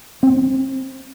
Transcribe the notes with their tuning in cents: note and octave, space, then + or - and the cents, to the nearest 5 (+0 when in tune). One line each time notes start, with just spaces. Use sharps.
C4 +20